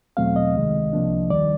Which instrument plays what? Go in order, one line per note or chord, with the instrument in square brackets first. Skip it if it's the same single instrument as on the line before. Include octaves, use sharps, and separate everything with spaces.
[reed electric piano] E2 B2 F#3 A3 C4 F5
D#5
C#2 C3 D#3 G#3
C2 C3 F3 A#3 D4
D#2 D#3 G3 D5